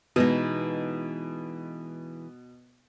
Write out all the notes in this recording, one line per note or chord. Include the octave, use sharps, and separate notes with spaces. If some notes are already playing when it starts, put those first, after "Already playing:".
B2 E3 G#3 D#4